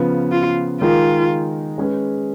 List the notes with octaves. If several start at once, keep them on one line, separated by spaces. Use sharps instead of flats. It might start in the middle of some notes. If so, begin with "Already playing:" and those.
Already playing: C#3 F3 B3
F4
D#3 G#3 D#4 F4 A#4
G#3 C#4 G#4 B4